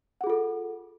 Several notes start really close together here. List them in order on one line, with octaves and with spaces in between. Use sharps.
F#5 G#4 F4 A4